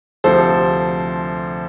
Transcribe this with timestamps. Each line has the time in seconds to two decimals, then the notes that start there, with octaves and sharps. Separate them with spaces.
0.24 D2 C3 F3 A4 C5